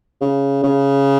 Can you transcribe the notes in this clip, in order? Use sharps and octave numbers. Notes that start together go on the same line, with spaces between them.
C#3
C#3